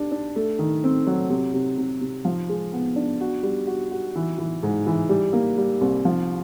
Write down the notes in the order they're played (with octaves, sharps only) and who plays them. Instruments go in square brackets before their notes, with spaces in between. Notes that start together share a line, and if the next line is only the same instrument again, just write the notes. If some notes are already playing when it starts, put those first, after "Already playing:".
Already playing: [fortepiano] D4 G4
D4
A3
D#3
C4
F#3
C3
C3
C3
C3
F3
G#3
B3
D4
F#4
G3
F#4
F#4
E3
E3
G#2
E3
G3
A#3
G3
C2
F3